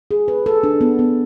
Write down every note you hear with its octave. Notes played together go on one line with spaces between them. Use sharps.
G#4
B4
A4
D4
B3
B3